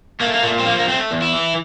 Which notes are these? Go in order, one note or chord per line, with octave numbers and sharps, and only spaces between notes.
A3 A#3
A#3
A#2 A3
C4
F3 A#3
A#3
A3 C4
E2
E4
E3